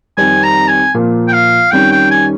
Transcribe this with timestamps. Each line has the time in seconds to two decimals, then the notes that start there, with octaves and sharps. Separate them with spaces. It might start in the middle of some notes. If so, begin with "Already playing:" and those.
0.17 F2 D#3 G3 C4 G#5
0.44 A#5
0.68 G#5
0.94 A#2 F3 A#3 F4
1.28 G5
1.33 F5
1.71 F2 D#3 G3 C#4 G5
1.92 G5
2.11 G#5